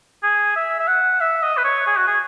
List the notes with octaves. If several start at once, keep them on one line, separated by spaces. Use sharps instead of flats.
G#4
E5
E5
F#5
E5
D#5
B4
C#5
G#4
F#4
G#4